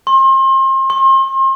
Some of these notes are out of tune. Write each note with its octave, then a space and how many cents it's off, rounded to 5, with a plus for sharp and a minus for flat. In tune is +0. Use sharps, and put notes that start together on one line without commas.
C6 +35
C6 +40